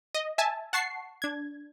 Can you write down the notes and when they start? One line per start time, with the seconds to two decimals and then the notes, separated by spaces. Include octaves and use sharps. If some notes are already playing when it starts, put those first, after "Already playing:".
0.14 D#5
0.38 E5 G#5 A5
0.73 F#5 A5 C#6 C7
1.22 D4 G#6